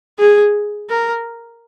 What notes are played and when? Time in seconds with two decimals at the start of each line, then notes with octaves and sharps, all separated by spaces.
0.19 G#4
0.89 A#4